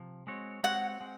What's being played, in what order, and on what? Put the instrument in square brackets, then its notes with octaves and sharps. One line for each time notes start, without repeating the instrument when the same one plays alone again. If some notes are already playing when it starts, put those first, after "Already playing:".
Already playing: [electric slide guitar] C3 F3
G#3 C4 F#4 C#5
[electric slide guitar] G#3 C4 F#4 C#5 [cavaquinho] F#5
[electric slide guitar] G#3 C4